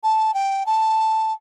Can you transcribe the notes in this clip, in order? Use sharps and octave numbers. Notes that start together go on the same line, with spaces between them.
A5
G5
A5